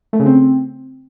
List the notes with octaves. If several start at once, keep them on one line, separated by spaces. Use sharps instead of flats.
A3
C#3
C4